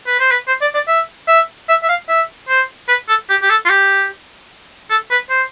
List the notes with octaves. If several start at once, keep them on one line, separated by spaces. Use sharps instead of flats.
B4
C5
B4
C5
D5
D5
E5
E5
E5
E5
F5
E5
C5
B4
A4
G4
G4
A4
F4
G4
A4
B4
C5